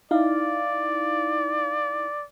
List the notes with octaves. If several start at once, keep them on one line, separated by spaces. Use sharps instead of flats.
D#4 E4 D5 F5